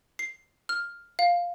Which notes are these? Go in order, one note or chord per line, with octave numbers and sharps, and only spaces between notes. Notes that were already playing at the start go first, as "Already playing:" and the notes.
C7
F6
F5